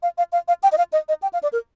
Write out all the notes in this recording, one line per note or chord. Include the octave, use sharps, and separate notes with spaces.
F5
F5
F5
F5
G5
D#5
F5
D#5
D#5
G5
F5
D5
A#4